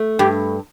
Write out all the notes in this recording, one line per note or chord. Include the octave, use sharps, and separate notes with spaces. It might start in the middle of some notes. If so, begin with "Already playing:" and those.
Already playing: A3
G2 G4